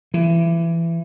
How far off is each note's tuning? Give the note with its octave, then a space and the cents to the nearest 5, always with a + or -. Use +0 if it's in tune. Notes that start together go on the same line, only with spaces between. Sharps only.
E3 +25